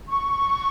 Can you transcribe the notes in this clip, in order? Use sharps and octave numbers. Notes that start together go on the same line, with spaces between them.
C#6